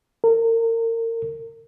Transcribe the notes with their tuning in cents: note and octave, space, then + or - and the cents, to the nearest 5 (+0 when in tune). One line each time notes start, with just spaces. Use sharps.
A#4 -30